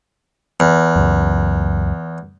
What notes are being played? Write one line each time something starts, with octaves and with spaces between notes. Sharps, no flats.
E2
C#2 F#2